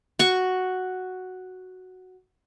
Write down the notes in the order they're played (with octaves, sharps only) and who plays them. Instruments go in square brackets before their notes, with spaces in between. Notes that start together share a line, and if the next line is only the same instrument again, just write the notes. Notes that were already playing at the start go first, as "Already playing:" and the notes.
[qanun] F#4 C#6